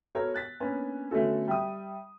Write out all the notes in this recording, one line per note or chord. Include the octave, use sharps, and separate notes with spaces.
B3 F#4 A4 A#4 C#5
F#6 A6 B6
A#3 B3 C#4 D4
D3 A3 B3 C#4 F#4 A4
G3 E5 D#6